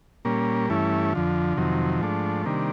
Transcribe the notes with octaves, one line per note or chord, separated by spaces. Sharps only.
A#2 G3 A#3 C#4
G2 E3 A3 C#4 E4
F2 D3 F3
F2 C3 D#3 F#3
G#2 F3 A3 D4
C3 D#3 G3 A#3 D4